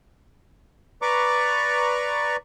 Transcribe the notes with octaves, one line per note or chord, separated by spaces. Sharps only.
B4 D5 A#5 C#6 D6